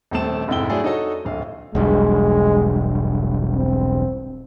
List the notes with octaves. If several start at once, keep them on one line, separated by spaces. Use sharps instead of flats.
D#1 A#1 A3 C4 A5 E7
F1 G#2 C3 E4 G5 G7
F#3 A3 D4 E4 G#4 D5
D#4 F#4 A4 C#5 D#5
D1 A#1 F5
E1 B1 G2 G#3
C4